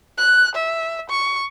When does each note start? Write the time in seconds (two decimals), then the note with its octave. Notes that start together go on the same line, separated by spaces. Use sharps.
0.18 F#6
0.55 E5
1.10 C#6